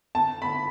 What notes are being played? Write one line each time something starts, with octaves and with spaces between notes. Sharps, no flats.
A5
B5